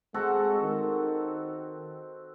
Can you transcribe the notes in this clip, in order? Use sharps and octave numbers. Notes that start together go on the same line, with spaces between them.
G#3 C4 F#4 A4
D#3